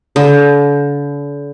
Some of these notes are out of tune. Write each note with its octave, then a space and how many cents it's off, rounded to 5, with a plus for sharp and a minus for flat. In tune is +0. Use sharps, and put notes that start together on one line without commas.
D3 -40